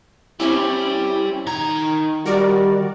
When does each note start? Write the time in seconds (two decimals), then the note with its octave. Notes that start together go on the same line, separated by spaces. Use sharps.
0.40 G3 C4 C#4 E4
1.47 D#3 A#5 G#6
2.26 G3 F#4 A#4 D5